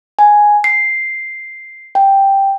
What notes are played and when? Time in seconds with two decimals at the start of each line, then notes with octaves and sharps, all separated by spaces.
0.19 G#5
0.64 C7
1.95 G5